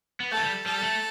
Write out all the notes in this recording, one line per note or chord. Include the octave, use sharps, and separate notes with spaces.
B3
A3 A4
E3
G3
G3 A4
A3